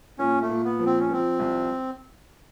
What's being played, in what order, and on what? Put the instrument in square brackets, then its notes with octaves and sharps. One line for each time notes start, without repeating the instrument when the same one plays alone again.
[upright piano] A#2 [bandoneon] C#4
[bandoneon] A3
[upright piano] A#2
[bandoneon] B3
[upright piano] F3
[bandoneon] C4
C#4
[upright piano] F3 [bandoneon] C4
[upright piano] C2